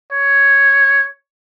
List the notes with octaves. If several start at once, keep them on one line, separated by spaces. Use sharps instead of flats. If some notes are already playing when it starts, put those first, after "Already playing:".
C#5